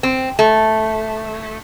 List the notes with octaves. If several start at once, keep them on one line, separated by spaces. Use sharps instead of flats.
C4
A3